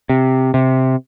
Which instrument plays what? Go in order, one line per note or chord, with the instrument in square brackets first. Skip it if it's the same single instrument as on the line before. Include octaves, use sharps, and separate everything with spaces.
[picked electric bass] C3
C3